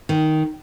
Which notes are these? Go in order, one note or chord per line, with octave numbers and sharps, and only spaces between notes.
D#3